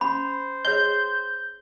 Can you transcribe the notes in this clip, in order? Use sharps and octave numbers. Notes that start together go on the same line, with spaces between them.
C#4 C5 B5
G#4 C#5 D#5 G6